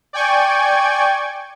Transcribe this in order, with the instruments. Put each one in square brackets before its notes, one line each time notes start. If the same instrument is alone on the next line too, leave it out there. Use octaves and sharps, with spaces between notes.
[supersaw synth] D5 G5 G#5 C#6 G#6